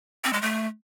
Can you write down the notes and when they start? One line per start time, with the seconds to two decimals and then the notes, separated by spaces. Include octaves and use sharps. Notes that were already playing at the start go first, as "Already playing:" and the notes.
0.24 C4
0.33 G#3
0.42 A3